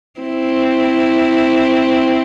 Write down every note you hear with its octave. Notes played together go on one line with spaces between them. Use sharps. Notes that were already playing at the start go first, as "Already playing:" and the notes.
C4 E4